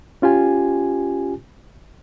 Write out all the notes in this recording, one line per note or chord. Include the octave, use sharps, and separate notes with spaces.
C#4 F4 G4 G#5